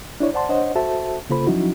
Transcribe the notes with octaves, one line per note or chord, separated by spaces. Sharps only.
D4 E4 C#5 D5
C5 D5 F#5 A5 C6
D4 C5 C#5 D#5 F#5
F#4 A4 C5 E5 A5
C#3 A#3 F4 A4 C5 B5
F3 F#3 C#4 D#4 E4 F#4